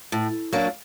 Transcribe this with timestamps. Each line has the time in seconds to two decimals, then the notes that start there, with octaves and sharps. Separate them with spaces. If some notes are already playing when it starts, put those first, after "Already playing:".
0.12 A2
0.53 F#3 A#3 D4 F#4